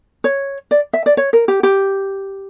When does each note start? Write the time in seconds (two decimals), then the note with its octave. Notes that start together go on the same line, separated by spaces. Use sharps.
0.24 C#5
0.71 D5
0.93 E5
1.06 D5
1.17 C#5
1.33 A#4
1.48 G4
1.63 G4